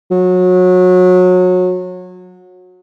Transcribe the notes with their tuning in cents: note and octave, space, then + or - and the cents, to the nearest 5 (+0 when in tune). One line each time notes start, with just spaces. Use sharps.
F#3 -25